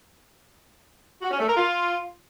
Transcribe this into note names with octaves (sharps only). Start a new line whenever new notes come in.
F#4
C#4
A3
A#4
F4